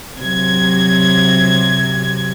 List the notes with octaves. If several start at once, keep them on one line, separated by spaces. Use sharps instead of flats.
C3 F#3 G#6